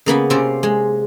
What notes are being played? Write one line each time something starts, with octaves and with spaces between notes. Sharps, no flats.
C#3 A#3 B3 B5
C3 C4 C#4 F4 C5 D5
G#3